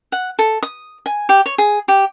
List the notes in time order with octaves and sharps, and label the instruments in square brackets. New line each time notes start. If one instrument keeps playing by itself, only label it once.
[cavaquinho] F#5
A4
D#6
G#5
G4
C#5
G#4
G4